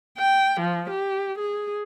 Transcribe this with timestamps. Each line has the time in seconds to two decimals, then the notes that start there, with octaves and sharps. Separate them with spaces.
0.17 G5
0.60 F3
0.90 G4
1.38 G#4